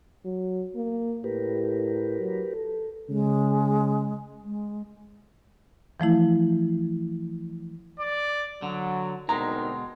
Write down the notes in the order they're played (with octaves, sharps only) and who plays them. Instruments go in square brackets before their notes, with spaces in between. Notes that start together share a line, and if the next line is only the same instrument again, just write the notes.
[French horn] F#3
A#3
[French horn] A2 [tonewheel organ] G4 A#4 B4
[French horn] F#3
A4
[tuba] C#3 [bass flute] G#3
[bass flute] G#3
[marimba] E3 F3 A3 E4
[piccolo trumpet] D5
[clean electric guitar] D3 [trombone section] F#3
[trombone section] D2 C4 A#4 [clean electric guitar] B2 G#3 [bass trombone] D#4 [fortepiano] A#5